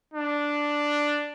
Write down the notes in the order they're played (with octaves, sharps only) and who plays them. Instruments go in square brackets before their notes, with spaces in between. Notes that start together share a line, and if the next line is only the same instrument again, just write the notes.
[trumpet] D4